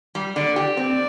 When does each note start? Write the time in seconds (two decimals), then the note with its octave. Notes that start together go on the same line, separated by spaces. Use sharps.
0.15 G3
0.36 D3 D5
0.56 G4
0.77 C4 D5